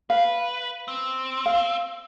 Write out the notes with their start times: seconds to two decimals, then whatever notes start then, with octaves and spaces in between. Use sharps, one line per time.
0.10 B4 F5
0.88 C4
1.46 F5